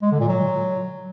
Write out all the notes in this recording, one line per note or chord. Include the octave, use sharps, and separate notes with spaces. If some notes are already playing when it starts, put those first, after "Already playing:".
G#3
D3
A#2
F#3